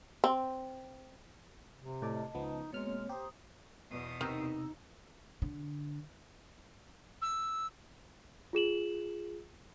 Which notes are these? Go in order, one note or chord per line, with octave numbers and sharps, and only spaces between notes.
C4
C3
A2 D5 D#5 A5
C#2 F3 B3 D#4
B2 G#3 A#3 C4 C#5 F6
G4 C5 A#5 D#6
E2 B2 D#6
C3 D#3 D#4 A#5 E6
D3
E6
F4 G#4 E7 F#7